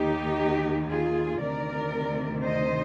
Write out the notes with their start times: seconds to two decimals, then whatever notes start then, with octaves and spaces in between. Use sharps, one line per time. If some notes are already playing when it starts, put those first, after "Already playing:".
Already playing: D#2 D#3 D#4 G4
0.89 F4 G#4
1.41 D2 C3 D#3 A#4 D5
2.45 C5 D#5